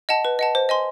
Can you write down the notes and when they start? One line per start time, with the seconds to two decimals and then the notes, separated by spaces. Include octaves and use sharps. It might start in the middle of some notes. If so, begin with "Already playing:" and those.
0.09 D#5 F#5 A5
0.25 B4
0.39 D#5 F#5 A5
0.55 C5
0.69 D#5 G#5 C6